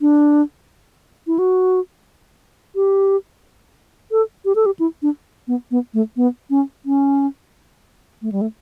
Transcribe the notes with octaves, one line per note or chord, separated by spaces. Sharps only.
D4
E4
F#4
G4
A4
G4
A4
G4
E4
D4
B3
B3
A3
B3
C#4
C#4
A3
G3
A3